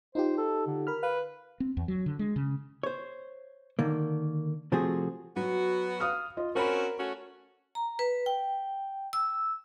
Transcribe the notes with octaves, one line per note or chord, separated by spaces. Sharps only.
D#4 F4 G4 C5
A4
D3
A#4 B5 F6
B4 F5
C4
E2
F#3
D3
G#3
C#3
C5 C#5
D3 D#3 A#3
C3 F3 A3 C4 F#4 G#4
F#3 B3 F#4
F5 D#6 F6
F4 D#5
C4 C#4 F#4 A#4 B5
A3 C#4 F#4
A#5
B4
G5
E6